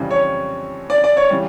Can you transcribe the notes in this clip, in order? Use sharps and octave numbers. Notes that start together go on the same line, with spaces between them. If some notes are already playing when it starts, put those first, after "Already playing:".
Already playing: F2 C#3 E3 G3
C#5
D5
D5
C#5
C#3 E3 G3